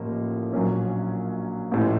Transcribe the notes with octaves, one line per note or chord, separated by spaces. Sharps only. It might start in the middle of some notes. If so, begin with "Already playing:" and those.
Already playing: A1 A2 F3 A#3
A#1 A#2 F#3 C#4
A1 A2 F3